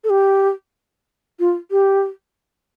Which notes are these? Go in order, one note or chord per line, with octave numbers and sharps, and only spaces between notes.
A4
G4
F4
G4